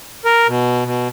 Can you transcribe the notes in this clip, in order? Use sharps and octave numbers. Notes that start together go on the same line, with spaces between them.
A#4
B2
B2